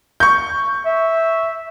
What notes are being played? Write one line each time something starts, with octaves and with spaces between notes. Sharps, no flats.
C#6 G6
E5